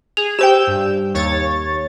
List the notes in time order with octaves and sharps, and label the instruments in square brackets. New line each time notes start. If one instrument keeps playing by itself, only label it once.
[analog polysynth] G#4 [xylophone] F7
[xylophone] G4 C5 G5 [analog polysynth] E6 G6
[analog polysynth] G2
D#2 C#5 A6